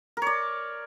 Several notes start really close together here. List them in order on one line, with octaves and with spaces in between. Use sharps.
A#4 C#5 D5